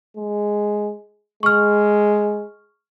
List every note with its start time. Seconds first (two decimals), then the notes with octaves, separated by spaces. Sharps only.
0.17 G#3
1.43 G#3 C#6 F6